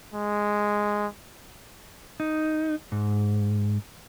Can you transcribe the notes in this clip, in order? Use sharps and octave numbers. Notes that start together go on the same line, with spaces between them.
G#3
D#4
G#2